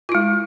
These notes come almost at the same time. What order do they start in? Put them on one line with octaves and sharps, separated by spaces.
F4 E4 G#3